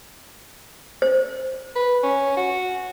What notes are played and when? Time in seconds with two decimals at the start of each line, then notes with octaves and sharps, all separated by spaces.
1.02 C5
1.75 B4
2.03 C#4
2.37 F#4